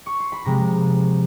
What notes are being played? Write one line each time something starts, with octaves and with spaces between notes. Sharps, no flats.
C#6
C6
B5
C3 F3 G#3 C4 A#5